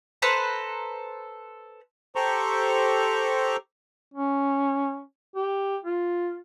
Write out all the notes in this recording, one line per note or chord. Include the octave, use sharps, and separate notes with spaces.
A4 B4 C5 A#5
G4 A4 C5 A#5 C#6
C#4
G4
F4